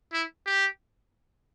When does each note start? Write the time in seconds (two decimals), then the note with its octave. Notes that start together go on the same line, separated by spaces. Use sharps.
0.13 E4
0.46 G4